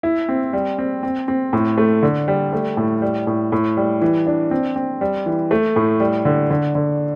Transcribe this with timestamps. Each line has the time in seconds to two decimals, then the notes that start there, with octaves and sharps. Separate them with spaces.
0.03 E4
0.29 C4
0.53 G3
0.78 C4
1.03 C4
1.28 C4
1.53 A2
1.78 A3
2.03 D3
2.28 G3
2.53 A3
2.77 A2
3.02 G3
3.27 A2
3.52 A2
3.77 G3
4.02 E3
4.27 D4
4.51 C4
4.76 C4
5.01 G3
5.26 E3
5.51 A3
5.76 A2
6.00 G3
6.25 D3
6.50 D3
6.75 D3